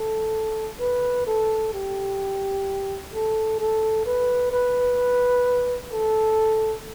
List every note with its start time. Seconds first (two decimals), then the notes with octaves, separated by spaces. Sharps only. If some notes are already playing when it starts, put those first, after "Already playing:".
Already playing: A4
0.80 B4
1.27 A4
1.73 G4
3.13 A4
3.59 A4
4.06 B4
4.52 B4
5.92 A4